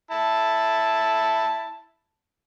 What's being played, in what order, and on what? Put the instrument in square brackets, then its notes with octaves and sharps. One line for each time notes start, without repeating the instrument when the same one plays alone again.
[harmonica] E4 A5